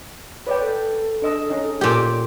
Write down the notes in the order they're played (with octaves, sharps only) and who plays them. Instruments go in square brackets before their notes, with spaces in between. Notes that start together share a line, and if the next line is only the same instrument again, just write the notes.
[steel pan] B4 D5 G5 [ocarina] C#5
[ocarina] A4
[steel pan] D4 D#5 E6
C#4 D#4 D#5
[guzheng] A#2 G4 [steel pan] G#5 D6